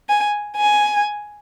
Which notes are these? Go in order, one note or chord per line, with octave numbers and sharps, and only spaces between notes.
G#5
G#5